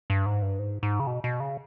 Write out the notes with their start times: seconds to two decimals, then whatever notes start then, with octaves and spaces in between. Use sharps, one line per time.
0.10 G2
0.26 G#2
0.42 G2
0.59 G#2
0.83 G#2
1.00 C#3
1.07 B2
1.24 B2
1.40 C#3